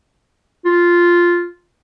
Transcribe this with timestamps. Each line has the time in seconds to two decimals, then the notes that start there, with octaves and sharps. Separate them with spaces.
0.65 F4